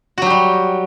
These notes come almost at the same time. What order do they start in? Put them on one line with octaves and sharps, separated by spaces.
F#4 F#3 G4 G3